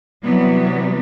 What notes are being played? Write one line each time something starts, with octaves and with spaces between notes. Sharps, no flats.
C3 E3 F#3 G3 B3